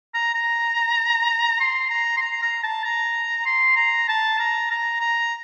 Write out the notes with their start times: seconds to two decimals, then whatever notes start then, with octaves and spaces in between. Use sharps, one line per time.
0.14 A#5
0.35 A#5
1.60 C6
1.90 A#5
2.17 C6
2.21 A#5
2.42 A#5
2.63 A5
2.84 A#5
3.46 C6
3.76 A#5
4.08 A5
4.39 A#5
4.70 A#5
5.00 A#5